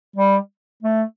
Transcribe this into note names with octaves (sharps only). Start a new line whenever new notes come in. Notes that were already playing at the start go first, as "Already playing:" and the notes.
G3
A3